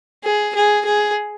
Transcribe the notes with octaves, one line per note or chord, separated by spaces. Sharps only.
G#4
G#4
G#4